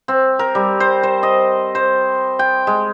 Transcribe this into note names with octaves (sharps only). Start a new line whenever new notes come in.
C4
A#4
G3
C5
C5
D#5
C5
G5
G#3